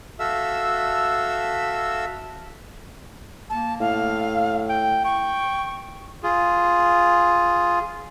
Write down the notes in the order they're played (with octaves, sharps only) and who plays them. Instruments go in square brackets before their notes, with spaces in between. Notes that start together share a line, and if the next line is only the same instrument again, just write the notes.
[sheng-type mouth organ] F#4 A4 E5 F5 E6
[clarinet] A#3 [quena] A5
[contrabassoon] A2 [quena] F5
[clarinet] G5
[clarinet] G5 [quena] C#6
[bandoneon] F4 G#4